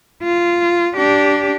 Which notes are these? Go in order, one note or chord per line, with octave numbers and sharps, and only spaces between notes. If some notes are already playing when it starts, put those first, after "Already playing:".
F4
D4 G4